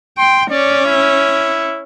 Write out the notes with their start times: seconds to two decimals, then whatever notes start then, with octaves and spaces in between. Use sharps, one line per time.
0.18 G5 C6
0.51 C#4 D5
0.86 E4